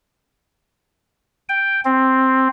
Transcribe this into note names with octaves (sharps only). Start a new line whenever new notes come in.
G5
C4